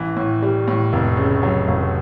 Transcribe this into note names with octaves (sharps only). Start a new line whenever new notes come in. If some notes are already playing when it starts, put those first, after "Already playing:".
Already playing: A1 E3
A2
G3
A2
F1
C#3
F#3
F1